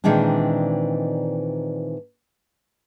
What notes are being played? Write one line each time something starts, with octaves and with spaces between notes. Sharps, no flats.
A#2 D#3 E3 G#3 C4 D4